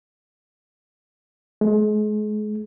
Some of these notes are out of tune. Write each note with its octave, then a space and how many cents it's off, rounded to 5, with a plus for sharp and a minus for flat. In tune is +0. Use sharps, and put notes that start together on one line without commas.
G#3 +35